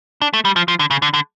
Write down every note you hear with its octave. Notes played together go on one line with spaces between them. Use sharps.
D4
A3
G3
F3
F3
D3
C#3
D3
D3